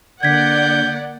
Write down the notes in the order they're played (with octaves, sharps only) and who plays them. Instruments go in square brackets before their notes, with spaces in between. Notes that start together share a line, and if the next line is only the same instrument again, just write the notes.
[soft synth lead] D3 [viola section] A#3 D5 F#5 [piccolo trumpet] G6 [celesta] G#6 B6